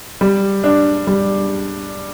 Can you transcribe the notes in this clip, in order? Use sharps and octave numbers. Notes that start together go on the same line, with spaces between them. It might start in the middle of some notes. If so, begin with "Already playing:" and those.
G3
D4
G3